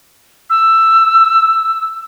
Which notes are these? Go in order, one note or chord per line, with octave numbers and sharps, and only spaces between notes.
E6